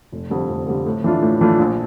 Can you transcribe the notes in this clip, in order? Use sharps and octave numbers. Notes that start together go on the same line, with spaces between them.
F1
F2 D3 G3
F1
F2 D3 G3
A2
E3 A3 D4 F4
A2
E3 A3 D4 F4
A#1